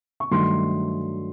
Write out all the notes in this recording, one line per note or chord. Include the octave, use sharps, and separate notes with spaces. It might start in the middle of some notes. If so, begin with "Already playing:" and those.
C#6
G2 D#3 F#3 A3 C6